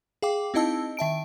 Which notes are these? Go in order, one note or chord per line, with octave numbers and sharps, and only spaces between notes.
G#4 F5 G5 D6
C4 D#4 E4 D#5 A5 E6
D#3 E5 A5 D7